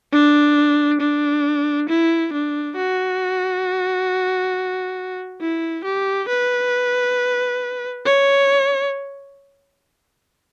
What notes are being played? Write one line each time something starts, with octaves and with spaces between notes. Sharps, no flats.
D4
D4
E4
D4
F#4
E4
G4
B4
C#5